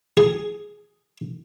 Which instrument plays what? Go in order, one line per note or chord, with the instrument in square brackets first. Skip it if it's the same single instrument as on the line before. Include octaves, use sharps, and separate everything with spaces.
[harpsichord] G#4